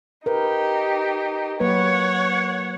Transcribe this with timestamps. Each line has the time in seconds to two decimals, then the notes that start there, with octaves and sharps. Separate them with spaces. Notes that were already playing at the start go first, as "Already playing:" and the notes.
0.26 D#4 G4 A#4 B4
1.60 F#3 A#3 B4 C#5 F#5